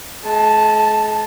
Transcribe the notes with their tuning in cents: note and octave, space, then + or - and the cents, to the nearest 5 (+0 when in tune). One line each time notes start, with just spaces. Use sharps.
G#3 +45 A5 +0